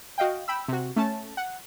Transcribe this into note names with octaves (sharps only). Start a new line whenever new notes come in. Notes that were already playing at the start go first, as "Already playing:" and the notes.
F#4 D#5 F5 G5
G5 B5 E6
C3 F#4
A3 C#4 A5
F#5